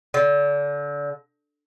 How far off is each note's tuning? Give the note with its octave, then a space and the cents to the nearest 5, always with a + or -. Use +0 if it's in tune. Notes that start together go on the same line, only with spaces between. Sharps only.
D3 -30